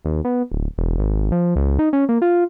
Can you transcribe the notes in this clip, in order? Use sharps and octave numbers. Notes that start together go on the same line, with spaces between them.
D#2
B3
D1
E1
G#1
F3
C#2
D#4
C#4
A#3
F4